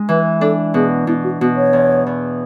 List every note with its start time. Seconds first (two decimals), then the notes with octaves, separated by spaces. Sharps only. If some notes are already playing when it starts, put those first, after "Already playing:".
Already playing: G#3 D4
0.09 E3 B4
0.41 D4 A4
0.74 B2 G#4
1.07 B2 E4
1.24 F#4
1.41 B2 F#4
1.57 C#5
1.73 E2
2.07 E2